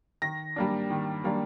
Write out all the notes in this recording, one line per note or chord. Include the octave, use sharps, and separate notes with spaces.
D#3 A#6
G3 A#3 D4
D#3
G3 A#3 D4